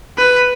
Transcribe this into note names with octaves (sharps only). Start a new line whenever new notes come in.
B4